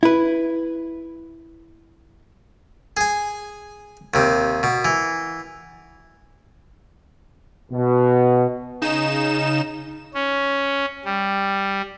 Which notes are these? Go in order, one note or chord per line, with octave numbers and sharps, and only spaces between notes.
E4 B4
G#4 G#5
D#2 C3
B2
E3
B2
C#3 D#4 E7
C#4
G3